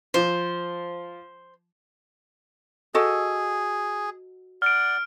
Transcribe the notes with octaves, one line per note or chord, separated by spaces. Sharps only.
F3 C5
F#4 G#4 A4 D#5
D5 F#5 F6 D7